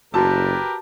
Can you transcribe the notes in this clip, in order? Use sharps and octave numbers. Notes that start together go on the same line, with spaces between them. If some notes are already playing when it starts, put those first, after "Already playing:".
F#1 F#4 G4 A#4 B4 A5 E6